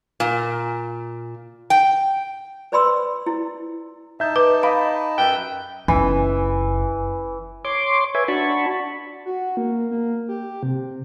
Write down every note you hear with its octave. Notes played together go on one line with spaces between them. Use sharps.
A#2
G5
B4 C5 D5 B5 C6 E6
E4
D#4 E5 A5 G6
B4 D6
D#5 F5 B5 D6
F#2 B4 G5 E6
F#1 E3
C#5 C6 D6
B4 C#5 E5 G#5
D4 F#4 A5 B5 C#6
F#4
A#3
A#3
G4
C3